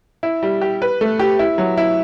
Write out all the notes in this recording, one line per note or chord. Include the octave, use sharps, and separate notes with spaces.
E4
G3
G4
B4
A3
G4
E4
F#3
E4